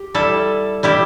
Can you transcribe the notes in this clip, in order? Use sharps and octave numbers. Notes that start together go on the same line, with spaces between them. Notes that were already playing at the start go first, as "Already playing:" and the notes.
Already playing: G4
G3 E4 A4
G3 E4 G4